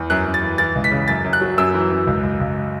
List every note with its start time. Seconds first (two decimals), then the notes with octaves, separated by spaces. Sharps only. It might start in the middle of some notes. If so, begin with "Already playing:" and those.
Already playing: E2
0.10 F#2 F#6
0.25 F#2
0.34 A6
0.43 E3
0.58 E3 A6
0.75 C#2
0.84 B6
0.91 C#3
1.08 F#2 A6
1.24 F#2
1.33 F#6
1.41 F#3
1.58 F#2 E6
1.74 E3
1.90 F#2
2.07 C#2
2.23 C#2
2.40 C#2